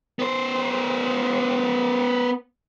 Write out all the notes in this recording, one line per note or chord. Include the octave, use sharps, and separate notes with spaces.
B3 C5